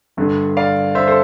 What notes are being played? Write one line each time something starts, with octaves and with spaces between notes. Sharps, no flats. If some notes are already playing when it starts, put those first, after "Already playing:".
G1 G2 D3
D5 F5
C5 E5
A4 C5